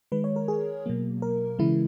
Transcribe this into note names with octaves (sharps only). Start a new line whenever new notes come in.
D#3 G#3 B4
C#5
A#4
G#4
B2 F#3 A#3
A#4
C#3 E3 G#3 E4